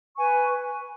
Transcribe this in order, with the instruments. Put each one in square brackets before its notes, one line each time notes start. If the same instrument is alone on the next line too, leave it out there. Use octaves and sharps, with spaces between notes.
[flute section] B4 G#5 C#6